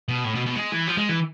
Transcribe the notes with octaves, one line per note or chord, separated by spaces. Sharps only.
B2
A2
B2
B2
G#3
E3
F3
G#3
E3